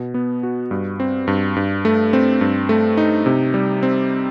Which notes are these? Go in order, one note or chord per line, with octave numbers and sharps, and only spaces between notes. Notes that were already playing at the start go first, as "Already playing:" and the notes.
Already playing: B2
B3
F#4
G2
C4
G2
G2
A3
C4
G2
A3
D#4
C3
G3
C4